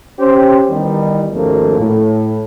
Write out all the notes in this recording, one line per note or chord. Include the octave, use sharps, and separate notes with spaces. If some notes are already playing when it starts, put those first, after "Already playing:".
C#4 G4 C5
D#3 E3 G3 B3 D#4
G#1 D#2 F3 A3 A#3 C#4
A2